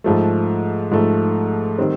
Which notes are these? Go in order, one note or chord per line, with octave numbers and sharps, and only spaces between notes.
G#2 F3 A3
G#2 F3 A3
D#3 G3 C4